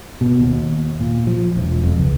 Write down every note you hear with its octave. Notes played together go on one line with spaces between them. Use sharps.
B2
D#2
A#2
F3
E1
F2
C#2